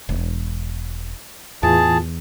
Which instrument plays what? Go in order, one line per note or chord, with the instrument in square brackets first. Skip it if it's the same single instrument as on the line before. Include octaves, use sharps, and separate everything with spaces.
[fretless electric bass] E1
[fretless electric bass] E2 [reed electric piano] A2 E3 F4 [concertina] G#4 A5